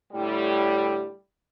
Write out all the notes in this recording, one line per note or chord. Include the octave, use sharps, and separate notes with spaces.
A2 D3 G3